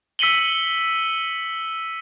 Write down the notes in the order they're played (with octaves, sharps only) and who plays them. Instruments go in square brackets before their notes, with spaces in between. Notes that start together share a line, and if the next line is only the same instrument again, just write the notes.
[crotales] E6 B6 C#7 D#7 F#7 G7